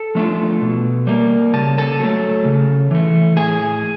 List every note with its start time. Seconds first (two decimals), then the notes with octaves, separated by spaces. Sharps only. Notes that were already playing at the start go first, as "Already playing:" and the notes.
Already playing: A4 A5
0.15 F3 A3 D4 F4
0.61 B2
1.07 G3 A#3
1.53 C#3 A5
1.78 A4 A5
1.99 F#3 A3
2.45 C#3
2.91 E3 A3
3.37 A2 G#4 G#5